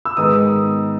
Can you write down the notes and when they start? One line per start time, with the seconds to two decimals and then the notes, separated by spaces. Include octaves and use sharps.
0.05 E6
0.17 G#2 D#3 G#3 B3 D#4 D#6